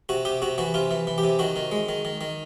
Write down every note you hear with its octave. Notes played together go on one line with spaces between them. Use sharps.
C3 F#4
C3 G4
C3 F#4
E3 F#4
C3 F4
E3
E3
G4
C3
D#3 F#4
D#3
G#3
D#3
D#3
D#3